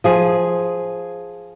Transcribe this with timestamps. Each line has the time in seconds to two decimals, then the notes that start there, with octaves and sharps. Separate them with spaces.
0.04 F3 G#4